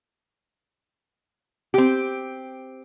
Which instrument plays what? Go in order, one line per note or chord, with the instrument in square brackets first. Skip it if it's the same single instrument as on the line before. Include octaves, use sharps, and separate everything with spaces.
[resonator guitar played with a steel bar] C4 G4